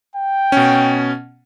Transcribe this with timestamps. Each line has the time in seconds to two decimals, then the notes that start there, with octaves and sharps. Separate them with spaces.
0.16 G5
0.52 B2 C#4